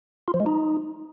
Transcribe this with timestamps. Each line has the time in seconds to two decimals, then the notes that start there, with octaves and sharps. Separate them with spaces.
0.28 F4
0.34 F3
0.40 G#3
0.46 D#4